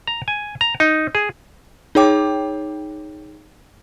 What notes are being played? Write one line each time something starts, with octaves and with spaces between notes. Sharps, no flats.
A#5
G#5
A#5
D#4
G#4
D#4 G#4 C#5 G5 D6